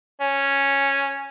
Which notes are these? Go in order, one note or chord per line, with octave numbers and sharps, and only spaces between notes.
C#4